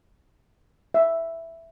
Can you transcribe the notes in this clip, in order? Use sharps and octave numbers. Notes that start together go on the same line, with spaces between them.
E5